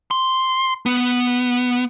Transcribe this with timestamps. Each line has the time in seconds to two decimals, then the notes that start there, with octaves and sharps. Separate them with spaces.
0.11 C6
0.86 B3